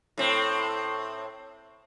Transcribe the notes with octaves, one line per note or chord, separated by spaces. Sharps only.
A2 C4